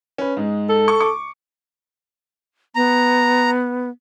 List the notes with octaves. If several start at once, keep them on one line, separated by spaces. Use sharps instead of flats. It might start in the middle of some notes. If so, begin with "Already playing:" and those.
C#4 B4
G#2 G#3
A4
C#6
C#6 D6
B3 A#5